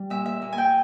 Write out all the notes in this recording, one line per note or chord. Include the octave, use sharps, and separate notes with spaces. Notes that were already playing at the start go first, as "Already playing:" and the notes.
Already playing: G3
A#2 E5
E5
A#2
G#5
G5